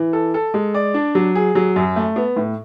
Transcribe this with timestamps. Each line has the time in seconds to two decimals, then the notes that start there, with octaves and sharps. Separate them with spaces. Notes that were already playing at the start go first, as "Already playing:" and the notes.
Already playing: E3
0.13 A4
0.34 A4
0.54 G#3
0.74 D5
0.94 D4
1.15 F#3
1.35 G#4
1.55 F#3
1.76 F#2
1.96 A3
2.16 B3
2.36 A2